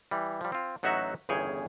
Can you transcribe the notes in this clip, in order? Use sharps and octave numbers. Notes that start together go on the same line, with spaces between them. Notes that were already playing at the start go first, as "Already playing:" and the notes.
E3 G3
F3 G3
C4 F4
A1 F#3 D#4 F#4 E5 F#5
G1 E2 C#3 G#4 C#5 G5